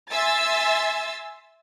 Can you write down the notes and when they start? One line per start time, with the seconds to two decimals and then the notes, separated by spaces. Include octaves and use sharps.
0.11 E5 G#5 C6 E6 A6